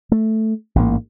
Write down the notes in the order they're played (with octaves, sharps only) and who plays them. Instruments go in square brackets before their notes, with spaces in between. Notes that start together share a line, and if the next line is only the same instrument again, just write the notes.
[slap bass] A3
A1 G#2 B2 A#3